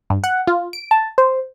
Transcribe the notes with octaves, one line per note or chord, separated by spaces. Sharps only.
G2
F#5
F4
D7
A5
C5